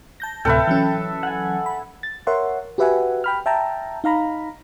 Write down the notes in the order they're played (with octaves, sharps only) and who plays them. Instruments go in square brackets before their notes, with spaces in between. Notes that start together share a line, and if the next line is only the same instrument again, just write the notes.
[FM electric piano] A5 G6 A#6
[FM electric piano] D2 A2 C3 [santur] A4 B4 E5 [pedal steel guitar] G5 B5
[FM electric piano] E3 F#3 C#4
[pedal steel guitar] F#5 G#5
[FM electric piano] B5
A6
A#4 C#5 E5 F#5 C6
F#4 G4 B4 E5 F#5 G#5
G5 B5 F6
E5 G5 A5 A#5
D#4 F5 A#5 B5